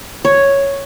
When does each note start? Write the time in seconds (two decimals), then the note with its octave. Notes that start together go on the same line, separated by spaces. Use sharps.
0.25 C#5